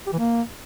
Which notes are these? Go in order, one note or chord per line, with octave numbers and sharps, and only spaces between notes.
G4
E3
A#3